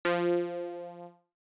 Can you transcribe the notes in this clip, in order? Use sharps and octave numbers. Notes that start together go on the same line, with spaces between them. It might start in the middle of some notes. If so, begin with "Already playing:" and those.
F3